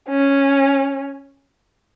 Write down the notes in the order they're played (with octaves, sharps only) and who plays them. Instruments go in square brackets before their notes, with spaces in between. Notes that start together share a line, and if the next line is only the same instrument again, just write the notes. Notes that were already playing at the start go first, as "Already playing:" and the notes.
[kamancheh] C#4